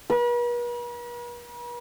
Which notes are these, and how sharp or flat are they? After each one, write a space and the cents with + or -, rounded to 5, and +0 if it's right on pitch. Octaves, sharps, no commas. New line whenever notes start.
B4 -45